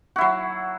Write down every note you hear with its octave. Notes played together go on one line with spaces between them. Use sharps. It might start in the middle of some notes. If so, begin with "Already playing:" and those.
F#3 E4 F#4